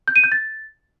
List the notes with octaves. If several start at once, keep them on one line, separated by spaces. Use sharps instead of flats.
G6
D#7
G6
A6